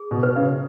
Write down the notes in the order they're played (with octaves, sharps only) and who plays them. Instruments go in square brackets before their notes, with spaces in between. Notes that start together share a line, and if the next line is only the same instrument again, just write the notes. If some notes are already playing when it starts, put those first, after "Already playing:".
Already playing: [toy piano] G#4
[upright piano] B2
[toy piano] B4
[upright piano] C#3